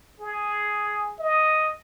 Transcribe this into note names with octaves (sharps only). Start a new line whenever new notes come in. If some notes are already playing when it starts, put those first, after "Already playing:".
G#4
D#5